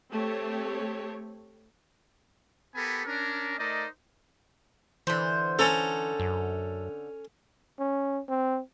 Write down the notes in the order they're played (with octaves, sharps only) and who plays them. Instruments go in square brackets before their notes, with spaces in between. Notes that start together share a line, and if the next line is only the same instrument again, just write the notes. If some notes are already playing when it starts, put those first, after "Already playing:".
[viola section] A3 C4 G4 C#5
[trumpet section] B3 G4 A4 A#4 G#5 B5
C#4 D4 A#4
A3 D#4 A#4 C5 D5 D#5
[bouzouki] D3 C5 [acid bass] E3
[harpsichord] C#4 A#5 [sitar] A4
[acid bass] F#2
[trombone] C#4
C4